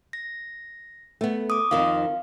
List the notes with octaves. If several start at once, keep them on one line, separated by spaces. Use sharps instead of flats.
A#6
A3 B3
D6 D#6
F2 D#3 F3 F5